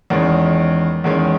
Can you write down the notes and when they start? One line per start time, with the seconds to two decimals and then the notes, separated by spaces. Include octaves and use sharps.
0.10 E2 D#3 G#3 C#4
1.04 E2 D#3 G#3 C#4